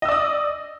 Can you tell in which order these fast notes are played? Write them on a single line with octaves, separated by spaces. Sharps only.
D#5 E6 D5 D#6